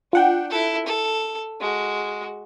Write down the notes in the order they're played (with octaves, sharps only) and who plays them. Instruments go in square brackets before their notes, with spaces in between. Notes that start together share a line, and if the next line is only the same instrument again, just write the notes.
[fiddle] D4 [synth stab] F4 F#5 G5
[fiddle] E4 A4
A4
G#3 F#4